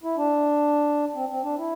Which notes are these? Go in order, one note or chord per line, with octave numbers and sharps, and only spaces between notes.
E4
D4
C4
C4
D4
E4